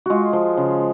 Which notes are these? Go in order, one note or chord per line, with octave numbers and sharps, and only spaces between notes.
G#3 F4 F#4
F3
C#3